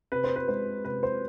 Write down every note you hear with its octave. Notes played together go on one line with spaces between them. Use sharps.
C3 B4
C5
B4
G#3 C5
C3 B4
C5